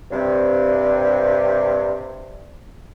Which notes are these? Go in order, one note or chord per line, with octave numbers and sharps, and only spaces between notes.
G2 C3